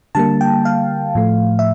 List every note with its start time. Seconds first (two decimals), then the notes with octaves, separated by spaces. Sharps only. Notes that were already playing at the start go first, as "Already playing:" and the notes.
0.15 D3 G3 A#3 A5
0.41 G5
0.65 F5
1.15 A2 F3 A3
1.59 E5